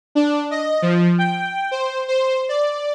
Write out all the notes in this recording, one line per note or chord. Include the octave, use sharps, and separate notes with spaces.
D4
D#5
F3
G5
C5
C5
D5